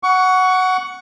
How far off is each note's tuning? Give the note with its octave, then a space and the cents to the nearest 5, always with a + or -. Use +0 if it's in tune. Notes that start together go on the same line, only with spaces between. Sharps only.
F#5 +0 C#6 +25